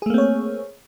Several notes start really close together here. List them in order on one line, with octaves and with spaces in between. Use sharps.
G#4 A3 A#3 C4 C#5